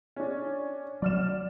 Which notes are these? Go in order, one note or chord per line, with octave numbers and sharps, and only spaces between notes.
C#4 D4
F#3 D5 F6 E7